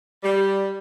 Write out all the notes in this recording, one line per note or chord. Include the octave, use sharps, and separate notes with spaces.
G3